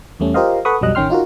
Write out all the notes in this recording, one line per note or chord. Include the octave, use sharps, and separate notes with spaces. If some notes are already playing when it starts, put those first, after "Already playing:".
E2 G3 A3 C#4
F4 G4 A#4 C5 D#5 F5
A4 B4 F#5 B5 C#6 D#6
B1 F2 F#3 G3 D#5 F#6
A1 D#3 C#4 G5 C6 F6
D#4 F4 F#4 A#4